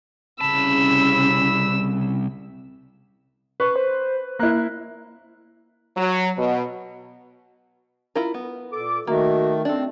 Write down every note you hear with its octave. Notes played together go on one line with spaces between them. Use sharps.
C2 C#3 A5 B5 E6
B4 C#6
C5
A#3 E4 F#6
F#3
B2
E4 F4 A#4
B3
A#2 A4 D6
D#3 A3 A#3 F#4
C4 D4 A4